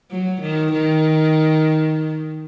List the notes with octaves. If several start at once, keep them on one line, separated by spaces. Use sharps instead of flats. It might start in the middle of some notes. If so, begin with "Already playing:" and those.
F#3
D#3
D#3